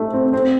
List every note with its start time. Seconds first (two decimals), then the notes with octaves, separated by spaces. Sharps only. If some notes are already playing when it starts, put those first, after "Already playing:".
Already playing: A3 D#4
0.13 C4
0.33 C4